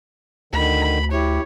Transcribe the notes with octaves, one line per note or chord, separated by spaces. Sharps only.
D2 D3 D#3 B5
E4 G4 C#5